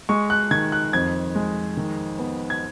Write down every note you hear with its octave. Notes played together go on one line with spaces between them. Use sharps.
G#3 C#6
F#6
D#3 G#6
F#6
F2 G#6
G#3
D#3
B3
G#6